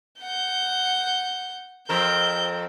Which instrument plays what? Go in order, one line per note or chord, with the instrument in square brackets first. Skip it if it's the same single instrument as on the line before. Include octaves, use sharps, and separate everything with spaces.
[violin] F#5 G6
[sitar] F2 C4 A#4 [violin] G6